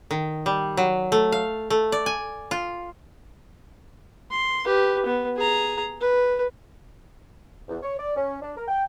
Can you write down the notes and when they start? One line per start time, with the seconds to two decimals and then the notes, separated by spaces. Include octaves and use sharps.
0.11 D#3
0.46 G3
0.77 F#3
1.12 A3
1.32 F5
1.70 A3
1.92 D5
2.06 G#5
2.51 F4
4.31 C6
4.65 G4 B4
5.06 B3
5.36 G#4 A#5
6.00 B4
7.69 E2
7.83 C#5
7.99 D5
8.16 C#4
8.41 D4
8.56 A#4
8.68 G5